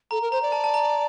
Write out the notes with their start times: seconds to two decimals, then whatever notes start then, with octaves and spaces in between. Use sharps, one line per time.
0.11 A4 A#5
0.22 A#4
0.32 C5 A#5
0.43 D5
0.52 A5
0.64 A5
0.74 A#5